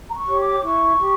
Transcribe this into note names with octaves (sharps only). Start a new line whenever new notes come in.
A#5
C#6
G4 C#5
D6
E4 C#6
G4